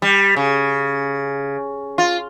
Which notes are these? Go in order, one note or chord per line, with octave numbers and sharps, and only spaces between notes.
G3
C#3
F4